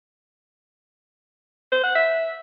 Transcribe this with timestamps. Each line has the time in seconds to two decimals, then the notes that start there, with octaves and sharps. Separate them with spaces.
1.72 C5
1.84 F#5
1.95 E5